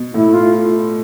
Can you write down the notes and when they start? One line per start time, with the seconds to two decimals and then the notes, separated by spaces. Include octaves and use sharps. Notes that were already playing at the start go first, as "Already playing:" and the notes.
Already playing: B2
0.14 A2 E4
0.35 F4